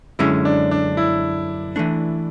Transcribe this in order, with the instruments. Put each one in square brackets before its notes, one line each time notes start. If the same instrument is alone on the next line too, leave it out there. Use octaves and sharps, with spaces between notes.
[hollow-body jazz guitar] F#2 D3 G#3 C#4 [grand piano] E4
[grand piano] D4
D4
E4
[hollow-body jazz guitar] E3 A3 D4